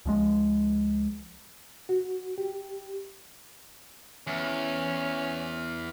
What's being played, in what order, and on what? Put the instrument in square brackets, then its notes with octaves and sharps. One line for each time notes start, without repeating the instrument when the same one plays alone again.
[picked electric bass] C#2 F3 G#3
[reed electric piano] F#4
G4
[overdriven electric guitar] E2 [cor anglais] C#4